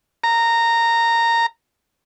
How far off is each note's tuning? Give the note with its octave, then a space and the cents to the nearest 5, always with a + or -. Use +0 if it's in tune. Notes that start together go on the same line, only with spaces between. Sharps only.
A#5 -10